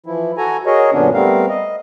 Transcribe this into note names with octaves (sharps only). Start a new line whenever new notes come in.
E3 F3 E4
F#4 A4 G#5 A#5
F#4 G#4 A#4 C#5 D#5
F#2 A#2 D3 B3 C#4 D4
G3 A3 B3 C4 A#4 F5
D#5